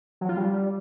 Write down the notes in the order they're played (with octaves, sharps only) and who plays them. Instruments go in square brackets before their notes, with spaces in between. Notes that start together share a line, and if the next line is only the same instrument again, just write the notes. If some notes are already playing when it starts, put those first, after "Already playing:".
[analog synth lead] F#3
F4
G3